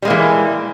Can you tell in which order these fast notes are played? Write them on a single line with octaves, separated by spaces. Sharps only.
G3 G#3 A#3 E3